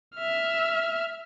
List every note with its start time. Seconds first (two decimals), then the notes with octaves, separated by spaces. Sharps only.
0.16 E5 F6